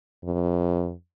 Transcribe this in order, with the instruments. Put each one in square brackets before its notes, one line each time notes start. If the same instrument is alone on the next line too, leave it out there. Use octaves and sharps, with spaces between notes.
[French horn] F2